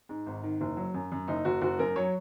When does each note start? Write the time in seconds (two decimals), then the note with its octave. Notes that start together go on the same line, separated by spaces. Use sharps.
0.09 G#2
0.26 G#1
0.43 D#3
0.61 F#1
0.77 F#3
0.94 F#2
1.12 F#2
1.28 F#1 D#4
1.45 F#1 F#4
1.62 F#1 F#4
1.79 F#2 A#4
1.96 F#3 C#5